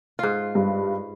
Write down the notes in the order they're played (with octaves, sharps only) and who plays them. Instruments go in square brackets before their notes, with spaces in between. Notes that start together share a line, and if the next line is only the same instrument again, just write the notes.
[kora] G#2 F4
[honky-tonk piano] G2